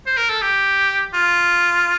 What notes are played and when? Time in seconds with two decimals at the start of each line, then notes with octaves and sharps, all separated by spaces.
0.06 C5
0.17 A#4
0.29 A4
0.41 G4
1.13 F4